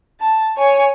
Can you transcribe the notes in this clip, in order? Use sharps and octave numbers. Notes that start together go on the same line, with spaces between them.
A5
C#5 G#5